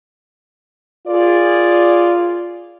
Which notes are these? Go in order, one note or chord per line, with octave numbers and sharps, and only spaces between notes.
F4 G#4 A#4 D5